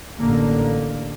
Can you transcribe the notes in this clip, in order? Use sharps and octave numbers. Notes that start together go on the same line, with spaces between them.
A1 D3 A#3